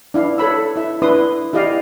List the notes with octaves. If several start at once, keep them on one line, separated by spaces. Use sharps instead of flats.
D4 E4 F5
A4 C#5 B5 E6
E4 E5
D4 E4 B4 C6 D#6
E4 G4 D5 D#5 F5